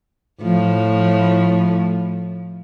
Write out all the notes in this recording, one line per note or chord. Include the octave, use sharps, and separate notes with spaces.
A2 F3